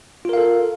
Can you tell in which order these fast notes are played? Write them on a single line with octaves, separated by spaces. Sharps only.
F4 A#4 F5 A4